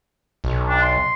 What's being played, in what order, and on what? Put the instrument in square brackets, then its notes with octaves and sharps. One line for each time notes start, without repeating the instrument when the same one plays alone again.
[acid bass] B1
[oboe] D4
C6